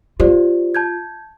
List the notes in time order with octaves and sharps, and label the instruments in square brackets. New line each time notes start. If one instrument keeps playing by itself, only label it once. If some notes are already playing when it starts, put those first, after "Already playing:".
[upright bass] F4 [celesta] G4 C5 D5
[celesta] A5 G6 G#6